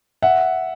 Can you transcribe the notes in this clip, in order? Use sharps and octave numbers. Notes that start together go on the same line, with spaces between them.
E5 F#5